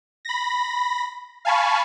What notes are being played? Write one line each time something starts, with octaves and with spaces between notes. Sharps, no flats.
B5 A#6
F5 G#5 A5 B5 C#6